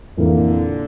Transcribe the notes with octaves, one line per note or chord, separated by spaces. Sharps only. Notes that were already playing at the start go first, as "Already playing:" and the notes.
F2 A#2 D3 E3 A#3